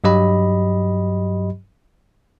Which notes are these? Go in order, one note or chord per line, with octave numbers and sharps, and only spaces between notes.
G2 F#3 G4 D#5 B5